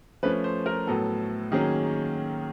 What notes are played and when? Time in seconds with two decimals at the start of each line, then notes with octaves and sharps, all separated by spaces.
0.23 F3 A3 C#4 B4
0.44 C5
0.66 A#4
0.87 A2 F#3 B3 A4
1.52 D#3 F#3 A#3 C#4 G#4